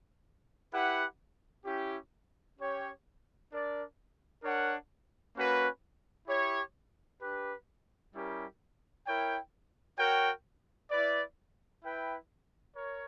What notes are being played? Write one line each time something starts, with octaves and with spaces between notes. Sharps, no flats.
E4 G4 B4 F#5
C#4 E4 G4
C#4 G4 C#5 G5
D4 A#4 D5
D4 A#4 C#5 F#5
A#3 C#4 F#4 B4
E4 G4 C#5
D4 G4 B4
G3 C#4 E4 G4 A#4
E4 A#4 C#5 G5
F#4 A#4 C#5 G5
E4 B4 D5
E4 B4 E5 G5
A#4 C#5